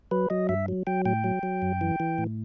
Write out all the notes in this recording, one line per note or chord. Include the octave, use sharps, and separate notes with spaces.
F#3 B4
F#3 D#5
G2 E5
F#3
F#3 G5
A2 G5
F#3
F#3
F#2
E3
E3
A2